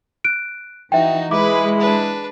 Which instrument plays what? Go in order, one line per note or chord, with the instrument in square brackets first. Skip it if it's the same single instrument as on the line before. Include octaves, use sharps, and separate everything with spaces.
[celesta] F#6 D7
[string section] E3 D#4 [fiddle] F#4 [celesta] E5 G5
[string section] G#3 [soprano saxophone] E4 [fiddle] B4 [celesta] D6
[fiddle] D4 B4